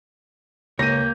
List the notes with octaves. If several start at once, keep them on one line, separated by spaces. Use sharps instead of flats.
C#2 A#3 G4 C#5 A#6 D#7